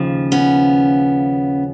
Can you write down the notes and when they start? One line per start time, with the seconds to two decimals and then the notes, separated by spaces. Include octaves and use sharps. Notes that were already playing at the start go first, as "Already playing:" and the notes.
Already playing: D#2 C#3 F3
0.32 B3 C#4